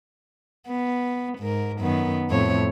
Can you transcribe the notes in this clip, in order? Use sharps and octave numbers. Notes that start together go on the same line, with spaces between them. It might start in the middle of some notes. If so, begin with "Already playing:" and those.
B3
G#2 A#4
F#2 D#3 B3
F2 A2 C#5